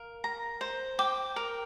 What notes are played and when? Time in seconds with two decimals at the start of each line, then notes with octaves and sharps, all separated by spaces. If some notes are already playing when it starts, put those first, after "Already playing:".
Already playing: A#4 F5
0.24 A#5
0.61 C5
0.99 G5 D6
1.36 A#4